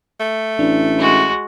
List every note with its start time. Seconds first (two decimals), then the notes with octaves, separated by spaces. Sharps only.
0.20 A3
0.59 A1 D4
0.99 G#3 F#4